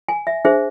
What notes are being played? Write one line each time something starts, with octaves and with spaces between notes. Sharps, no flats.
G#5
E5
D4 G#4 C5 E5